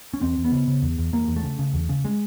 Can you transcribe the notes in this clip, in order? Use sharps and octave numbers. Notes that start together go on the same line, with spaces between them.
C#4
E2 C4
E2
B3
C#3
C#3
E2
E2
E2 A#3
E2
A3
C#3
C#3
E2
C#3
G#3